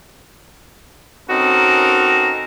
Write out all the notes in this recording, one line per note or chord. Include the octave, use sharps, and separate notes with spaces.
C4 C#4 D#4 F#4 A4 A#4